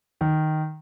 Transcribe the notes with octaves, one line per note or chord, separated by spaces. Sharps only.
D#3